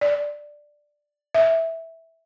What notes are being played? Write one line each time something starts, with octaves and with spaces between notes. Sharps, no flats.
D5
E5